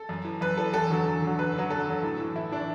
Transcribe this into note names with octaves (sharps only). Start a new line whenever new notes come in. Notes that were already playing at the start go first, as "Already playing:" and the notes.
Already playing: A4
F#2
E3
F#2 B4
E3 A4
E2 A4
D3 F#3
E2
D3 F#3
F#2 B4
D3 F#3
F#2 A4
D3 F#3
A2
E3
A2 E4
E3 D4